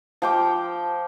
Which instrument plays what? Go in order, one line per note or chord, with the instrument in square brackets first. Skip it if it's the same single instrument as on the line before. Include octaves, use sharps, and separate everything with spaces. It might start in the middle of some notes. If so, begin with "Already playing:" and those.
[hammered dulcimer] F3 G5 D6